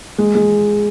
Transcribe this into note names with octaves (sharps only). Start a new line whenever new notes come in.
G#3
G#3